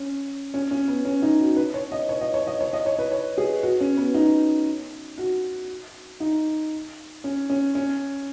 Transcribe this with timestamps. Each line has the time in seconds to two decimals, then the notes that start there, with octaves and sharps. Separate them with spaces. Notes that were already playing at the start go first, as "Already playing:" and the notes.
Already playing: C#4
0.54 C#4
0.71 C#4
0.88 B3
1.05 C#4
1.22 D#4
1.39 F#4
1.56 B4
1.74 C#5
1.92 D#5
2.09 C#5
2.21 D#5
2.34 C#5
2.47 D#5
2.61 C#5
2.73 D#5
2.86 C#5
2.99 B4
3.11 C#5
3.38 G#4
3.63 F#4
3.81 C#4
3.97 B3
4.14 D#4
5.18 F#4
6.20 D#4
7.24 C#4
7.50 C#4
7.75 C#4